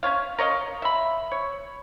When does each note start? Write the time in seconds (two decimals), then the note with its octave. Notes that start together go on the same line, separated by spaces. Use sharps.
0.03 C#4 D4 C#5 F5
0.39 A#4 C#5 D#5 F5
0.82 E5 B5
1.32 C#5